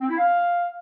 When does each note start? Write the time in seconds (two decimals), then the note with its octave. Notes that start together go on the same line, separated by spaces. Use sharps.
0.01 C4
0.09 E4
0.18 F5